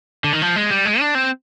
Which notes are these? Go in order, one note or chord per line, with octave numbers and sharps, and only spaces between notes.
D3
D#3
F3
G#3
G3
G#3
D4
C4